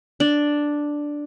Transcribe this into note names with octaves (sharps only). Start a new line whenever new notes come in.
D4